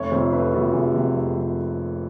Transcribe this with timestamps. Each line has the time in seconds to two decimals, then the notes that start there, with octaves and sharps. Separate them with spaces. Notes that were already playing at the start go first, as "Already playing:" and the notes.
Already playing: F1 C#5
0.11 F2 C3 F3 C5
0.32 F1 B4
0.53 F2 C3 F3 F#4
0.73 F1 G#4
0.94 F2 C3 F3
1.15 F1
1.36 C3 F3